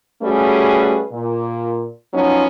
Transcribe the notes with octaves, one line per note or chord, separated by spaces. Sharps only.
G3 A3 C#4 F#4 G#4 B4
A#2
F3 F#3 B3 C#4 D#4